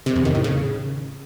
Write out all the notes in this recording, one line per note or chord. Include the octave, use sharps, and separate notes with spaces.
C3
E2
D#3
A2
C#3